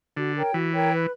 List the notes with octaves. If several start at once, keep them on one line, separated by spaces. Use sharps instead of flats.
D3 F#4
A#4 C#5 G5
E3 F#4
A#4 C#5 G5
B4